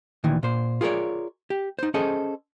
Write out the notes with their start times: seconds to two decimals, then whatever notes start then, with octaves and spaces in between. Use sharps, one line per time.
0.24 D2 A#2 D#3 E3
0.43 A#2 C5
0.81 F4 G#4 A#4 B4 C#5 D5
1.50 G4
1.79 D#4 C5
1.94 C#4 G#4 A4 C5 D#5